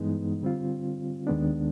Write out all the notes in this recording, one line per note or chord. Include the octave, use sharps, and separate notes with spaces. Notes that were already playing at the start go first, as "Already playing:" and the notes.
Already playing: G2 E3 G#3 B3 D#4
D3 G3 C4 F4
D#2 D#3 G#3 B3 D4